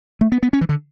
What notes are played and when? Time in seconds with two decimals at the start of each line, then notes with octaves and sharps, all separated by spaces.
0.21 A3
0.32 B3
0.43 B3
0.53 C#4
0.61 E3
0.69 D3